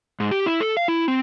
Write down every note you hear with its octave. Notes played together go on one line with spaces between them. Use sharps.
G#2
G4
E4
A4
F5
E4
C4